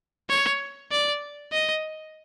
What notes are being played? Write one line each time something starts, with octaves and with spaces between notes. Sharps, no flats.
C#5
D5
D#5